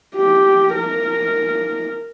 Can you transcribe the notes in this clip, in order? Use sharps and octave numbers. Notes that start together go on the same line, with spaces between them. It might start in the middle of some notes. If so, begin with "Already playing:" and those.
G4
A#4